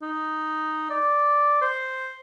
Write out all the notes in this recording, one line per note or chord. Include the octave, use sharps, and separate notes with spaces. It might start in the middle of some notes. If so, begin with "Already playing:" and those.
D#4
D5
C5